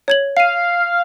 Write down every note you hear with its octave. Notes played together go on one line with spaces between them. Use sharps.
C#5 G#6 F#7
F5 C7 D#7